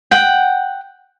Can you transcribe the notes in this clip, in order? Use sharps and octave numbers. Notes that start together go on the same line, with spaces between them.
F#5 G5